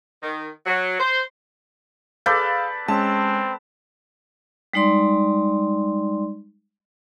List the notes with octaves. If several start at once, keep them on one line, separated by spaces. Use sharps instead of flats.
D#3
F#3
C5
G#4 A4 B4 D5 F5 G6
G#3 C4 C#4 A5
G3 G#3 D#4 D5 C6